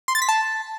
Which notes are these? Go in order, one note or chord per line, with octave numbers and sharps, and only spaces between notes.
C6
A6
B6
A5